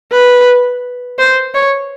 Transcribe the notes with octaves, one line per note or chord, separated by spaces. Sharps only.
B4
C5
C#5